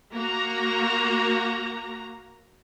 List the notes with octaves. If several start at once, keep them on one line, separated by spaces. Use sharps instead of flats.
A#3 F#4 A#5